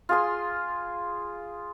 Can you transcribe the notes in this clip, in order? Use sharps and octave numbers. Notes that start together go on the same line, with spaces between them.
F4 G#4 C6